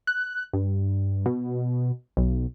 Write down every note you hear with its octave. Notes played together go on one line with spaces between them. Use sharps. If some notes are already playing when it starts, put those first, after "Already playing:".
F#6
G2
B2
B1